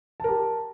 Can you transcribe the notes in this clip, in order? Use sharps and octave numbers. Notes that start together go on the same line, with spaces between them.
G4 A#4 A5